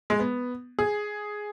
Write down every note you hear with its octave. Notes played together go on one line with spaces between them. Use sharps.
G#3
B3
G#4